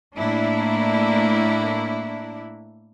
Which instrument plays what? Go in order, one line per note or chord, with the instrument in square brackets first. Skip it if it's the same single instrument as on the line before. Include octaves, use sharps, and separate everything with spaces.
[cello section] A2 A#3 D4 E4